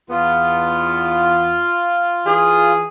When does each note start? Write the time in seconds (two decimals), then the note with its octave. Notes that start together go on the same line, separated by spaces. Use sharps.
0.10 E2 B3 F4
2.26 E3 G#4